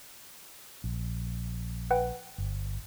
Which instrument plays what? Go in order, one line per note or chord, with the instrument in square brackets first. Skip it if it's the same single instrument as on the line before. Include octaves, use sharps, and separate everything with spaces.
[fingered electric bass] A#1
[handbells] B4 F#5 G5
[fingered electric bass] G1